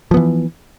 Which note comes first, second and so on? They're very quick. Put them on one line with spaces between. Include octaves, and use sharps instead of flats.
F3 B3 E3